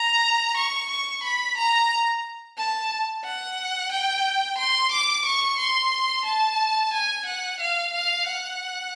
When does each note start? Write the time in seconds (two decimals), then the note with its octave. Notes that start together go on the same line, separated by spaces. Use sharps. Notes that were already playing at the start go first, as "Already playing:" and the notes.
Already playing: A#5
0.57 C#6
0.90 C#6
1.23 B5
1.58 A#5
2.58 A5
3.24 F#5
3.92 G5
4.58 C6
4.92 D6
5.25 C#6
5.59 C6
6.25 A5
6.93 G#5
7.26 F#5
7.60 F5
7.93 F5
8.27 F#5